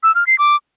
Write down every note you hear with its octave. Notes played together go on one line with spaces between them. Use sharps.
E6
F6
C7
D6